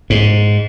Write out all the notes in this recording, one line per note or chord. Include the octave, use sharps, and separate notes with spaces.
G#2